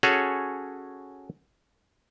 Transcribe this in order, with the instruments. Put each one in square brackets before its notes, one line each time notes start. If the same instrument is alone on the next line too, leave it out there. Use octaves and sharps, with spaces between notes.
[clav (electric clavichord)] C#4 F#4 G#4 A4 C#5